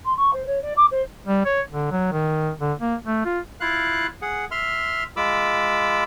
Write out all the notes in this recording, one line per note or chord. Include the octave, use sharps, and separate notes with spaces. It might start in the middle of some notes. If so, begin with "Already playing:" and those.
C6
C#6
C5
C#5
D5
D6
C5
G3
C#5
D3
F#3
D#3
D3
A#3
A3
F4
E4 F4 F5 F#6
G#4 F#5
E5 C6 F6
G#3 F4 B5 D6 E6